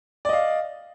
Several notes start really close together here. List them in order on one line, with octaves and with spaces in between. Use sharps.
D5 D#5 F5